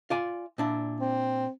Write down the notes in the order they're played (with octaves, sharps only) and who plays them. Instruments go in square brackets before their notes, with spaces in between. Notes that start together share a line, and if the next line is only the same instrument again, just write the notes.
[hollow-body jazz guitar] F4 D5 G#5
A#2 D4 E4
[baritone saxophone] C4